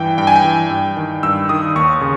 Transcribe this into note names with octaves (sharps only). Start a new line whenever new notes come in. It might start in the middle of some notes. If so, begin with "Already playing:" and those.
Already playing: G2 E3 G5
G2 G5
G#5
G5
E3
G2
D#3
G2 E6
D#3 D#6
D#2 C#6
C#3